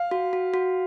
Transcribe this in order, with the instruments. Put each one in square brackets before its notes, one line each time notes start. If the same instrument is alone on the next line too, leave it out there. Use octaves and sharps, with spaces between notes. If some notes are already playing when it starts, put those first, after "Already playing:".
Already playing: [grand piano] F5
[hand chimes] F#4
F#4
F#4